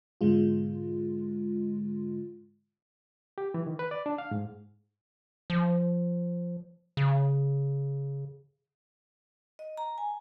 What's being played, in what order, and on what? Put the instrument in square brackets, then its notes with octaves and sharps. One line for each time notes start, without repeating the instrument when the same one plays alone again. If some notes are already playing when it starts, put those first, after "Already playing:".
[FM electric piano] G#2 B2 D3 G#3 F4
[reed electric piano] G4
E3
D#3
B4
D5
D4
F5
G#2
[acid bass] F3
C#3
[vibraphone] D#5
A#5
G#5